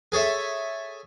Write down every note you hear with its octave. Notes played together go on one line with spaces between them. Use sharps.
G#4 A4 C#5 E5